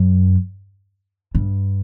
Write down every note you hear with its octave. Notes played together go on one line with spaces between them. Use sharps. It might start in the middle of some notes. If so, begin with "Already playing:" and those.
Already playing: F#2
G2